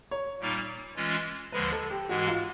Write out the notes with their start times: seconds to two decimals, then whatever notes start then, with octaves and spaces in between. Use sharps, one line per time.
0.11 C#5
0.40 A#2 G3 A#3 D#4
0.96 E3 G#3 C#4 F4
1.52 D#2 D3 F3 G#3 B4
1.72 A4
1.91 G4
2.09 G#2 E3 G#3 F#4
2.28 F4